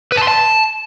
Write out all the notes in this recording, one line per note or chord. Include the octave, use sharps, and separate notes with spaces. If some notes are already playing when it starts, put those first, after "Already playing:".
B4
A5
C6
A5